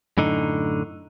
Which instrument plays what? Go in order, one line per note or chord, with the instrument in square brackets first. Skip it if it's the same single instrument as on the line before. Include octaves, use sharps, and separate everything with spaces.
[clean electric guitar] F#2 A2 D3 D#4